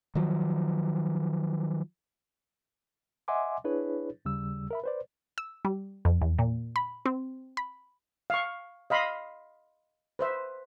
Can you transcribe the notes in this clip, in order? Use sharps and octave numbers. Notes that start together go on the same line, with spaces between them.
D#3 F3 F#3
D#5 E5 F#5 G#5 C6 D6
D4 E4 G#4 B4 C#5
D#2 C#3 G3 E6
A#4 E5 B5
B4 C5 D5
E6
G3
F2
E2
A#2
B5
C4
B5
F5 C#6
D#5 F5 B5 C6
B4 C5 E5